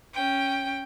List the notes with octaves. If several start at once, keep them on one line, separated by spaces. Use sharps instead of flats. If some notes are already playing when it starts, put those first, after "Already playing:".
C#4 G5